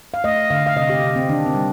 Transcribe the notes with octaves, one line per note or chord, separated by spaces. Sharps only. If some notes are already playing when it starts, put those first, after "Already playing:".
F5
A3 D#5
D3 F5
F5
C3 D#5
G4
C3
C4
D#3 D4
C4
G3